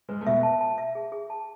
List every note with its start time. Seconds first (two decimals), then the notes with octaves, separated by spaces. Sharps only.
0.09 G#2 G#3 B4
0.21 A3
0.26 B2 B3 E5
0.43 A5
0.61 A5
0.78 E5
0.95 G#4
1.12 G#4
1.30 A5